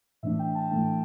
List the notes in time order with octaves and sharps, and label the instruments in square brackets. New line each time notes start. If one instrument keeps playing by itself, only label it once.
[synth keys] A2 E3 A3 D4 E5
G5
A5
A2 E3 A3 D4 G5